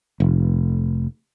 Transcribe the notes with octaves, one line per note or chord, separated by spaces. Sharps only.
F1